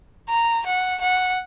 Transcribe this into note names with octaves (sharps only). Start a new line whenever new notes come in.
A#5
F#5
F#5